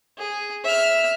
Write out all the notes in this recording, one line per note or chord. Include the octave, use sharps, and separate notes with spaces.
G#4
E5 F6